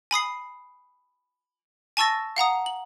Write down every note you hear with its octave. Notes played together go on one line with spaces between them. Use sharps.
G#5 B5 D#6 C7
G#5 A5 C#6 E6 A6 A#6
F5 F#5 A#5 D#6
F#7